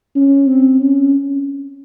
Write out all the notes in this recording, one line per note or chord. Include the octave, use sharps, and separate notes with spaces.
C#4
C4
C#4